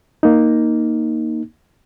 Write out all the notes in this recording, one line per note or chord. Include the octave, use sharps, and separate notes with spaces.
A#3 D#4